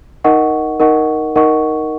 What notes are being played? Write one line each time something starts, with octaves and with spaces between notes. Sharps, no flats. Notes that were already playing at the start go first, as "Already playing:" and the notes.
D#4 A#4 D#5 F#5 C#6
D#4 A#4 D#5 F#5 C#6
D#4 A#4 D#5 F#5 C#6